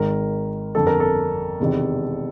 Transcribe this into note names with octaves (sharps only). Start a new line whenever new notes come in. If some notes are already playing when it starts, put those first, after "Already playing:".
Already playing: G#1 G#2 D#3 A#4
G1 F2 D3 A4
A#4
A4
E1 E2 C3 D#3